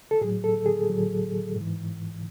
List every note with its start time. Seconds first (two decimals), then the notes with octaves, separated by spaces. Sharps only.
0.11 A4
0.21 A2 G#4
0.24 F#3
0.44 A4
0.66 G#4
0.89 A2 F#3
1.56 G#2 E3